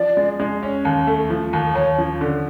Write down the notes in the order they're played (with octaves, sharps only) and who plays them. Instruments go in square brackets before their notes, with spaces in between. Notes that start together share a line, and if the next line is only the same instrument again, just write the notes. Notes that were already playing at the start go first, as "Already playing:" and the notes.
Already playing: [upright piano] F3 [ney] D5
[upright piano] G#3
G#3
C#4
D#2
A3
F3
D#2
[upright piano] D#2 [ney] C#5
[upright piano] F3
D3